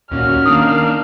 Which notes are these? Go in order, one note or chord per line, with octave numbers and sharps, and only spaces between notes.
D#2 A#2 C#4 F#4 F6
D#3 A#3 D4 D#4 D#6